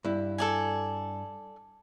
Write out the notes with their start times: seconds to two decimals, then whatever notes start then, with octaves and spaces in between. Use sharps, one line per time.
0.04 G2 E4
0.38 A4 D5 G#5